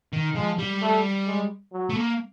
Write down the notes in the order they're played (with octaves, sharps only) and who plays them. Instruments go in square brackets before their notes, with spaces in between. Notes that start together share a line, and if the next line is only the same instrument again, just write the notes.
[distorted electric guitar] D#3
[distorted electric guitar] F3 [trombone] G#3
[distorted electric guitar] G3
[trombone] A3
G#3
F#3
[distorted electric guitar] A3
A#3